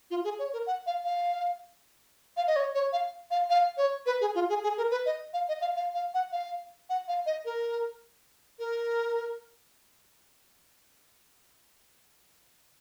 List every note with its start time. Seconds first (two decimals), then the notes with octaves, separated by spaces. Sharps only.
0.11 F4
0.24 G#4
0.39 C#5
0.53 A#4
0.67 F#5
0.86 F5
1.04 F5
2.37 F5
2.47 D#5
2.56 C#5
2.75 C#5
2.93 F5
3.31 F5
3.50 F5
3.77 C#5
4.06 B4
4.21 G#4
4.35 F4
4.49 G#4
4.63 G#4
4.77 A#4
4.91 B4
5.06 D#5
5.33 F5
5.48 D#5
5.61 F5
5.76 F5
5.94 F5
6.14 F#5
6.32 F5
6.90 F#5
7.08 F5
7.26 D#5
7.45 A#4
8.59 A#4